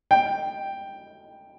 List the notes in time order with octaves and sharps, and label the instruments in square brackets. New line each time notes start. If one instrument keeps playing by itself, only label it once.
[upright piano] G5